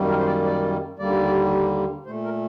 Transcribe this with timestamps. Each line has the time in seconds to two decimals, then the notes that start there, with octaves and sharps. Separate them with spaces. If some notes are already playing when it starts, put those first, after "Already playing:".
Already playing: F#2 D#3 G3 A#3
0.09 A#4
0.19 C5
0.27 D5
0.45 D5
0.99 D#2 D3 G3 A#3 D5
2.06 A#2 A3 C5
2.24 A#4